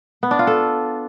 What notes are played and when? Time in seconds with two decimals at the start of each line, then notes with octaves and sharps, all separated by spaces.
0.23 B3
0.31 D4
0.39 F4
0.47 A4